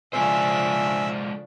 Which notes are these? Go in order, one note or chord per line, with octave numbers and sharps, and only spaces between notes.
C#3 F3 G#3 D4 A4 C5 E5 G#5